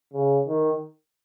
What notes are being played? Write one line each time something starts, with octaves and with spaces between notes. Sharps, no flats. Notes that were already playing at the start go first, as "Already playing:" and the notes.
C#3
D#3